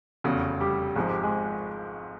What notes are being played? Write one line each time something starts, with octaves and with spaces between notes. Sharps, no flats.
F1 E2 C#3 F#4
G3 G4
G#1 G#2 F3 G#4
G4
G#3 G#4